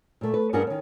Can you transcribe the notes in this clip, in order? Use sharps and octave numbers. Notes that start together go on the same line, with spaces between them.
A#2 A3
B4
G2 C#4 D4 G#4 A#4 F#5
D#3 C#4